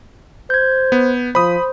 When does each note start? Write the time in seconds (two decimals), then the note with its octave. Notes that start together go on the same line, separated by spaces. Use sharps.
0.50 C5 G6 G#6
0.92 B3
1.35 F3 C5 B5 D#6